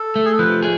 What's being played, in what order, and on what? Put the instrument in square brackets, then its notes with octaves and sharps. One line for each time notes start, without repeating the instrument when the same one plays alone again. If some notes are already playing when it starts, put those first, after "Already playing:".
Already playing: [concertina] A4
[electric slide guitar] A3
[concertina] G#4
A4
[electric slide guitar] F3 [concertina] B4
[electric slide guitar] G#4